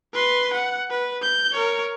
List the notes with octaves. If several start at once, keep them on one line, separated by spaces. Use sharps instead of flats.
B4 C6
F#5
B4
G6
A#4 C#5